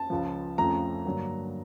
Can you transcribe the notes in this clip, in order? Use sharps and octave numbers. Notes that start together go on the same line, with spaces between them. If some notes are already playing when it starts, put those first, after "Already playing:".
Already playing: A5
C#2 C#3 F3
F2 C#3 F3 A3 A#5
G2 D3 F#3 A#3